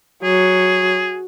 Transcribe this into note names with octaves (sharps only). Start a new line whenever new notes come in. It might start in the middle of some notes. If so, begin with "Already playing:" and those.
F#3 G#4